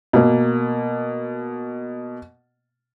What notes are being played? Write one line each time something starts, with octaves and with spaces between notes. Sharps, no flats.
B2 A#3